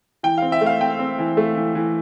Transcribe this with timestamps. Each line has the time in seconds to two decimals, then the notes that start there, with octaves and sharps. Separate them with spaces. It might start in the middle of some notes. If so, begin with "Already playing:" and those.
0.23 E3 G5
0.38 C4 F5
0.52 E5
0.61 A3
0.66 F5
0.81 C4 G5
0.99 C4
1.19 E3
1.37 A3
1.56 E3
1.75 E3